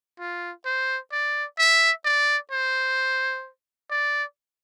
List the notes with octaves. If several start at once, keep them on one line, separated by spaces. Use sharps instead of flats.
F4
C5
D5
E5
D5
C5
D5